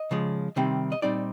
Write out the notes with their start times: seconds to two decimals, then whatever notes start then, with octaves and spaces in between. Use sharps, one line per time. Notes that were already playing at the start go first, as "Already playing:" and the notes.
Already playing: D#5
0.11 C#3 F3 G#3
0.56 C3 D#3 G3 C4
0.92 D#5
1.02 A#2 G3 C4 D#4 D5